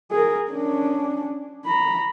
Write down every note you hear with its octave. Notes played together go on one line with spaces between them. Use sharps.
G#4 A#4
C#4 D4
A#5 B5